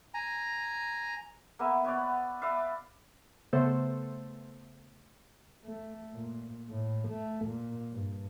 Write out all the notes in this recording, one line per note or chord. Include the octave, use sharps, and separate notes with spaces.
G#5 A#5
A#3 B3 E5 G#5
B3 C#5 D5 F#5
B4 D5 E5 F5
C#3 A3 B3 A4 C5
A3
A#2
A2
A3
A#2
G2